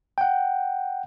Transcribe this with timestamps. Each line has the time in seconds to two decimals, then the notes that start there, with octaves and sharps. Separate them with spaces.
0.18 F#5 G5